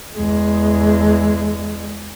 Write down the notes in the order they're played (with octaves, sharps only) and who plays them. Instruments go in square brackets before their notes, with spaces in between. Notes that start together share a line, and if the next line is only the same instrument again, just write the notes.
[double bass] E2 G#3